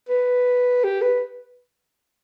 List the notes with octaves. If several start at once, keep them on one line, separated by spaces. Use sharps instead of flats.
B4
G4
B4